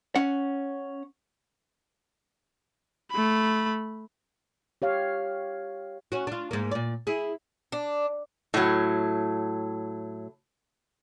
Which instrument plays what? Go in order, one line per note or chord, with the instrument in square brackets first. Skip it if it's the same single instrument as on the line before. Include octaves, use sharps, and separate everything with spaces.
[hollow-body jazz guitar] C#4 F#5
[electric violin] A3 B5
[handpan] G4 C#5 F5
[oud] C#4 F#4
D4 F4
G#2 A#3
A#2 D5
E4 G#4
[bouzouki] D4
[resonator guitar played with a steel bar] A2 F#3